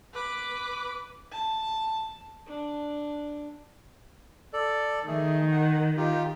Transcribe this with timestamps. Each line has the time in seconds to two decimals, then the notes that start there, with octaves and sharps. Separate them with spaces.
0.13 B4 D6
1.32 A5
2.47 D4
4.53 A4 D5
5.07 D#3 A3 G#4
5.51 F#5
5.97 D#4 F4 G4